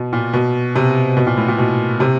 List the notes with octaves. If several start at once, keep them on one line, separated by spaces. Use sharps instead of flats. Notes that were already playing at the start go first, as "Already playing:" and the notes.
Already playing: B2
A#2
B2
C3
B2
A#2
A2
A#2
B2
C3